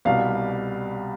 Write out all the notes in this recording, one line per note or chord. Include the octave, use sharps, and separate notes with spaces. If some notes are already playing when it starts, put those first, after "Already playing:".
C2 B2 G3 F5